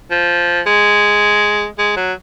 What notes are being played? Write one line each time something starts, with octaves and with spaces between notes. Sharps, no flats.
F3
G#3
G#3
F#3